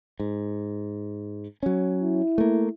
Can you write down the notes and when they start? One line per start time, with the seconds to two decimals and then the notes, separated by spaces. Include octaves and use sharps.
0.20 G#2
1.63 F#3 C#4
2.02 E4
2.38 A3 A#3